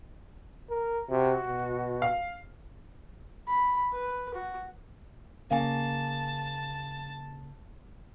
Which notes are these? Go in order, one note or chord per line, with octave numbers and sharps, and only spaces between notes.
A#4
C3 F#4
B2
F5
B5
B4
F#4
C#3 A#3 F5 G#5 A5